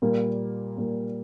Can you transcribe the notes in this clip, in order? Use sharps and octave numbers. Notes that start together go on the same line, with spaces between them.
A#2 G3 A#3
A#2 G3 A#3